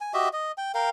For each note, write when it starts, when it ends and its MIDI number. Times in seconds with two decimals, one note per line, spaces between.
0.01 0.13 80
0.14 0.29 66
0.14 0.29 67
0.14 0.29 75
0.14 0.29 76
0.33 0.52 75
0.58 0.72 79
0.75 0.90 70
0.75 0.90 77
0.75 0.90 79